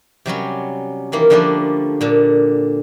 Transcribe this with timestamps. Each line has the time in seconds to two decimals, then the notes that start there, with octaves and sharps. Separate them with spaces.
0.26 C3 F#3 G3 C#4
1.12 D#3 E3 A#3
1.30 D3 F3 G3 A3 A#3 D4
2.01 A#2 D3